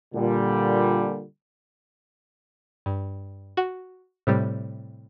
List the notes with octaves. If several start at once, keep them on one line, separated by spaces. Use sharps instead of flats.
A#2 D3 G3
G2
F#4
A2 C3 G3